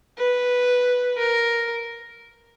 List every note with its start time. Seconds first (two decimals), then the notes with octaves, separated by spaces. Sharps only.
0.19 B4
1.18 A#4